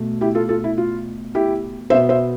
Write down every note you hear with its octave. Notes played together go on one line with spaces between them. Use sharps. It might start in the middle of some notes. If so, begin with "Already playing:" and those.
Already playing: B2 A3
E4 G4
F4 A4
F4 A4
E4
F4
E4 G4
B2 B3 C5 E5
C5 E5